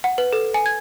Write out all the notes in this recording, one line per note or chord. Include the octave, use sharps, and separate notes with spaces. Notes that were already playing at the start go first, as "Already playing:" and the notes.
F#5
B4
A4
G#5
G#6